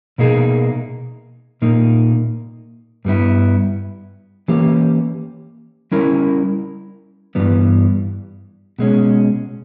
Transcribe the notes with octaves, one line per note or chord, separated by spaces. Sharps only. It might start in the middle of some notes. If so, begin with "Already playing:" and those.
B2 A#3 D#4 G#4
A#2 A#3 D#4
G2 G3 B3 E4
E3 A#3 C#4 G4
G3 C#4 E4 A#4
G2 E3 G3 B3
B2 G#3 C#4